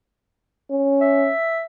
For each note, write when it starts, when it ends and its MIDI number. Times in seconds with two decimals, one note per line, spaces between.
0.70 1.31 61
1.01 1.63 76